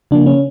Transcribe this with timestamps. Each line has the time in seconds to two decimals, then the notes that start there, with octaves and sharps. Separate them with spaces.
0.11 C#3 F3 A#3 D4
0.26 C#4